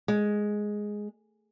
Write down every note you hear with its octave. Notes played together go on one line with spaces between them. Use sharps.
G#3